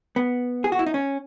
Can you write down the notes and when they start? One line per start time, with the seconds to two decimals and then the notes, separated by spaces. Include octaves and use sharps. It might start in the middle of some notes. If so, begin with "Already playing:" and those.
0.16 B3
0.64 G#4
0.72 F#4
0.79 E4
0.86 D#4
0.94 C#4